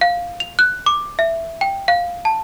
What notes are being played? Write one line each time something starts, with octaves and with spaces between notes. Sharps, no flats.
F5
F7
F#6
D6
E5
G5
F5
A5